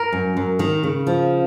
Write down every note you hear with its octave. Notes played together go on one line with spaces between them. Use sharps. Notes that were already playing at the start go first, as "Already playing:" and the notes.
Already playing: A#4
F#2
F#2
D#3
C#3
F3